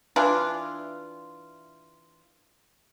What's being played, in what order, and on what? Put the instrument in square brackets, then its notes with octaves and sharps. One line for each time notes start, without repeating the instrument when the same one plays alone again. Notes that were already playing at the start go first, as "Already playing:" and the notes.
[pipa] E3 D4 E4 F4